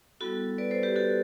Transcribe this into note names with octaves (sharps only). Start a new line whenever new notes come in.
G3 B3 E4 F#4 A4
B4 D5
A4 C5
G4 B4
F#4 A4